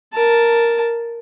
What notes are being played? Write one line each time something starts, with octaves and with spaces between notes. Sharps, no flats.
A#4 A5